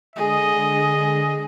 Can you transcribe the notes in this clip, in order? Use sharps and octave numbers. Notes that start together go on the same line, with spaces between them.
D3 G#3 G#4 D#5